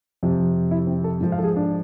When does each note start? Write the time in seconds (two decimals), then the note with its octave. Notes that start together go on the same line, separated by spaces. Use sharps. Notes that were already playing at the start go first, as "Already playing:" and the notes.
0.23 F2 C3 F3
0.71 E4
0.87 C4
1.04 A4
1.20 G#2 F3
1.32 F5
1.38 A4
1.44 G#4
1.56 D4